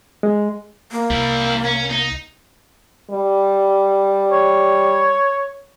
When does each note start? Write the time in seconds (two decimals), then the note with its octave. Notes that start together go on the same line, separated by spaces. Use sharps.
0.23 G#3
0.92 A#3
1.10 C2 G3 E4
1.64 C#4
1.90 D#4
3.10 G3
4.32 C#5